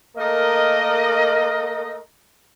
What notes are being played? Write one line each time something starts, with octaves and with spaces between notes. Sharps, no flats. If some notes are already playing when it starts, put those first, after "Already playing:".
A3 A#3 A#4 D#5